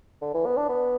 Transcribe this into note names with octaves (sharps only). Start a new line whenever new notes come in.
D3
E3
B3
D4
B3